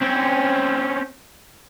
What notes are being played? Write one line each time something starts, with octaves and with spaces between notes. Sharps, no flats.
C4 C#4